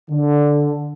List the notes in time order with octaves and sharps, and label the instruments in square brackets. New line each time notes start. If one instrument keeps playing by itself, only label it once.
[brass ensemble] D3